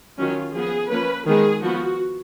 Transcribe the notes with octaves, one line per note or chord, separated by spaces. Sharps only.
D#3 F#3 C#4 F4
F3 B3 G#4
F3 A#3 C#4 B4
D#3 G#3 B3 G#4
F3 B3 F#4